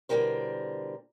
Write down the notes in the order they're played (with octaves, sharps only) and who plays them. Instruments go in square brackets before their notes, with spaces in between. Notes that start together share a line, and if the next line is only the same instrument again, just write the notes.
[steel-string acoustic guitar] B2 D3 E3 G3 A#4 C5